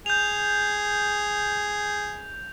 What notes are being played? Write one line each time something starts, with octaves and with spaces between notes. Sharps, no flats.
G#4 G6 F7